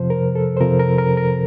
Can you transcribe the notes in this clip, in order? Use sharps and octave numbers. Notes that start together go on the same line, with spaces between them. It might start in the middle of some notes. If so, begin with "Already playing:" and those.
Already playing: F2 C3 F3 C5
A#4
A4
C5
F2 C3 F3 A#4
A#4
A#4
A#4